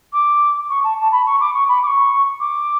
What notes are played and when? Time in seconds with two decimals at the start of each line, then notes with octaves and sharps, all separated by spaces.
0.13 D6
0.70 C#6
0.84 A5
0.98 A5
1.12 B5
1.26 C#6
1.41 D6
1.54 C#6
1.68 B5
1.83 D6
1.87 C#6
2.40 D6